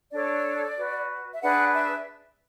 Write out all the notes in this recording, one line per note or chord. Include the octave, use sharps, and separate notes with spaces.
D4 A4 C#5 D5
F#4 B4
E5
D4 G#4 B4 F#5
E5